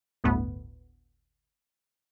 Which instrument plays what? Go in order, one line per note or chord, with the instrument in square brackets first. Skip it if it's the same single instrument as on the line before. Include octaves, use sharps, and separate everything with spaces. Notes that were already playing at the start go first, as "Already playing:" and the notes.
[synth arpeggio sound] G1 D2 A2 A3 B3